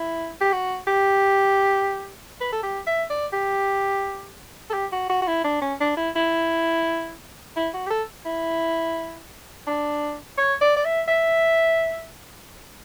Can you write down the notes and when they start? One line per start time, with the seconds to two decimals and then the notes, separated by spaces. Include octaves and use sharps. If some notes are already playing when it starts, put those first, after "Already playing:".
Already playing: E4
0.41 G4
0.52 F#4
0.87 G4
2.41 B4
2.52 A4
2.63 G4
2.87 E5
3.10 D5
3.33 G4
4.70 A4
4.73 G4
4.92 F#4
5.09 F#4
5.22 F#4
5.27 E4
5.44 D4
5.61 C#4
5.80 D4
5.97 E4
6.15 E4
7.56 E4
7.74 F#4
7.86 G4
7.90 A4
8.25 E4
9.67 D4
10.38 C#5
10.61 D5
10.76 D5
10.85 E5
11.08 E5